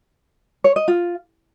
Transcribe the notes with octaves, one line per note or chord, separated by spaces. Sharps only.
C#5
D#5
F4